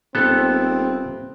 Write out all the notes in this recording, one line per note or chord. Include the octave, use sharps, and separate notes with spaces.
D#1 B3 C4 A4